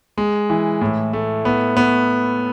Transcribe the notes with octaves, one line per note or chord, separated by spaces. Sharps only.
G#3
E3
A2
A3
B3
B3